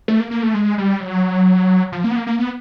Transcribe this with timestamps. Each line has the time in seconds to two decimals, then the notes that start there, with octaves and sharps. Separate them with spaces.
0.08 A3
0.20 A#3
0.31 A#3
0.43 A3
0.54 G#3
0.78 G3
1.00 F#3
1.92 F3
2.04 A#3
2.11 B3
2.16 A#3
2.27 A#3
2.39 B3